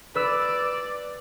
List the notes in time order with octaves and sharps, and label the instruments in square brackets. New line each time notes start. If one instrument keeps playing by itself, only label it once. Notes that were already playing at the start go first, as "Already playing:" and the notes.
[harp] B4 E6 E7 [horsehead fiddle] D5